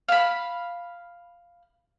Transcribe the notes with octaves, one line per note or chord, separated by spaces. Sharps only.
F5 B5